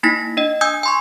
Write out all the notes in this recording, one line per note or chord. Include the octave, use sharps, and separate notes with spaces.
A#3 D#4 E4 A#6 B6
D4 D#5
G#5 D#6 E6 G6 G#6
G#5 C6 C#6